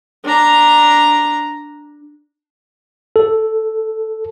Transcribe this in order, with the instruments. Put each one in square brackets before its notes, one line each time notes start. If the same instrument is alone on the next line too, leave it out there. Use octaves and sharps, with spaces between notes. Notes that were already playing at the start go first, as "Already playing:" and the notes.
[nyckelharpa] D4 A#5
[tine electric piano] A4